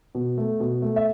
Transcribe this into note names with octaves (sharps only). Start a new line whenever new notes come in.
B2
A3
B2
A3
E5